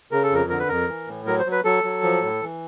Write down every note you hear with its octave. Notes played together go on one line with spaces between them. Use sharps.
C#3 A#4
A4
F2 A#4
D3 A#4
B4
F2 A#4
E3
A2
F#3 A#4
C5
F#3
B4
F#3 A4
F#3
F3
A2
E3